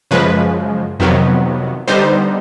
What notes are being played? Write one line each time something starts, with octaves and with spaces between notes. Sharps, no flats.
F#2 C#3 F3 G#3 B4
F2 C3 D#3 F#3 B3
D3 G3 B3 D#4 C5